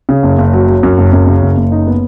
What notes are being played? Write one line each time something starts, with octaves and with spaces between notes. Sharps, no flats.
C#3
F#1
F#1
F#3
F#3
F#2
F#1
F#2
C#3
F#1
F#1
D#4
B3